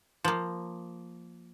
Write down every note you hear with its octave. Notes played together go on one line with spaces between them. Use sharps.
F3 A#3